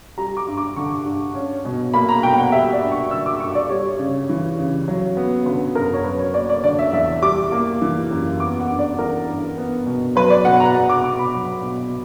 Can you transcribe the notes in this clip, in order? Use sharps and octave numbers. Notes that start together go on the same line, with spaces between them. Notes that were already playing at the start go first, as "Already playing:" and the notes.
G3 A#5
D6
G2
D6
D3 C#6
G2
C#4
B2
A#3 B5
A#5
B2 G5
F#5
G3 E5
D5
G2
C#6
D3 E6
D6
G2 C#6
D5
G3 C#5
C#3
E3
C#3
F#3
B3
D3 B4
F#2 A#4
C#5
F#3 B4
C#5
A#3 D5
D5
D3 D5
E5
E2 E5
G3 D6
A#3
E3
F#2
B3 D6
F#5
G2
D5
E3 A#4
G2
B3
B2
F#3 B4
D5
B2 F#5
A#5
B3
D6
B2 D6
B5
F#3
B2